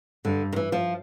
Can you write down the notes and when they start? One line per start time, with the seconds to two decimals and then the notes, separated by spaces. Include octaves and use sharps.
0.25 G2 D3
0.53 D#3
0.56 E3
0.72 F3